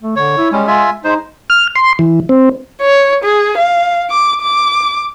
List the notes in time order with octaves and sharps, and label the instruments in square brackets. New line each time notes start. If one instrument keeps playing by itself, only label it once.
[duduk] A3
[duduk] D3 [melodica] C#5
[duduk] E4
[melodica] G3 C#4 [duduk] G#3
[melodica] F4 E5 G#5
[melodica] G#3 C5 [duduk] D#4
[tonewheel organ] F6
C6
E3
C4
[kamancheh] C#5
G#4
F5
D6
D6